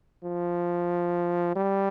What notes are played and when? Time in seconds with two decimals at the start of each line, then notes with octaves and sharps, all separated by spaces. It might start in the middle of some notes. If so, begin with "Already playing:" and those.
0.24 F3
1.56 G3